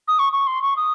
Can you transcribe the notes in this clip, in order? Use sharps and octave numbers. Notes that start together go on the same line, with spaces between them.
D#6
C#6
C#6
C6
C#6
D#6